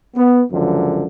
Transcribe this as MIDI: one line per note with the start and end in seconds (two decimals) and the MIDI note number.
0.16 0.42 59
0.52 1.07 37
0.52 1.07 42
0.52 1.07 50
0.52 1.07 53